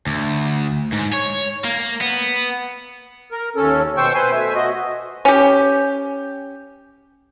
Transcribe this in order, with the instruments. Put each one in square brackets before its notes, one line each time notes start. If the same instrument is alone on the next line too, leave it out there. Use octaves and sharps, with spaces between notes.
[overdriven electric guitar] D2
G#2
C#5
A#3
B3
[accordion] A#4
D#2 C#4 A4
B2 C5 G5 C#6 E6
B4 C5 G#5 C6
B2 A3 E5 G#5
F#4 D#5
[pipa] C#4 G4